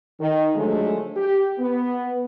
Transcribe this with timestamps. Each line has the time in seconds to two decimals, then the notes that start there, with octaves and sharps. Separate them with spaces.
0.19 D#3
0.55 D3 F3 F#3 G#3 A3
1.16 G4
1.58 B3